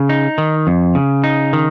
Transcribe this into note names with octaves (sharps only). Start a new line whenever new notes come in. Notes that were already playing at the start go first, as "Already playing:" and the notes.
Already playing: C#3
D#4
D#3
F2
C#3
D#4
D#3